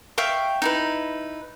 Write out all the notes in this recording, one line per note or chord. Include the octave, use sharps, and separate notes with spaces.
E5 F5 G5 C#6
D#4 E4 B4